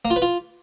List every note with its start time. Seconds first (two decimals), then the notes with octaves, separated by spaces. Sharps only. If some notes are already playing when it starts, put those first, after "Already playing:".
0.05 A#3
0.11 F4
0.16 B4
0.22 F4